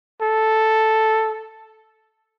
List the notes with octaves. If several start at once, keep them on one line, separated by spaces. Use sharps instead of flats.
A4